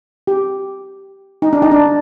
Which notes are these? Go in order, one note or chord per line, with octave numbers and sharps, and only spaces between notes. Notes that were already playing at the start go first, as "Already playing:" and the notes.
G4
D#4
D4
D#4
D4